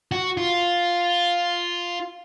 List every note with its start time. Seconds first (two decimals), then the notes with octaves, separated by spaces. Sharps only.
0.12 F#4
0.37 F4